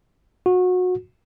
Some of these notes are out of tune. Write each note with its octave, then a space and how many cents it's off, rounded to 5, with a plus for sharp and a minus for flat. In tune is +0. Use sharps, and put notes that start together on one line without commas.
F#4 -25